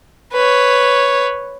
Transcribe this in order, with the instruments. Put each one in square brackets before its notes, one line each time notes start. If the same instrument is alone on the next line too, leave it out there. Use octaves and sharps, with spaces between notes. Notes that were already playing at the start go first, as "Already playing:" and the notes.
[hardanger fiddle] B4 C#5